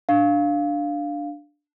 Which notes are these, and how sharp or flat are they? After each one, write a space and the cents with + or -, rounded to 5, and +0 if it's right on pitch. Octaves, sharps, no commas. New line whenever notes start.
D4 +0 F5 +0